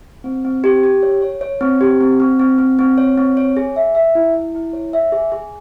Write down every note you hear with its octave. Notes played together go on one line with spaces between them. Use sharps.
C4
C4
G4
G4
C#5
C#5
C#5
C4
G4
C4
C4
C4
C4
C4
C#5
C4
C#5
G#4
E5
E5
E4
E4
E4
C#5
E5
G#4
G#4